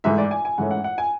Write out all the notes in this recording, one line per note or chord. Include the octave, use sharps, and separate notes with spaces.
G#2 E3 A3 E5
D5
G#5
G#5
G#2 E3 A3 C#4 F#5
F#5
F#5
G#5